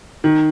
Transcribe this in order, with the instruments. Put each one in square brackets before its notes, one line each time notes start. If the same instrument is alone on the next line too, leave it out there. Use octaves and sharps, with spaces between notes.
[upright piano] D#3